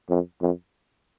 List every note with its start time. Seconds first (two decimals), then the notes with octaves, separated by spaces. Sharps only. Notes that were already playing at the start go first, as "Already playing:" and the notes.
0.10 F2
0.41 F2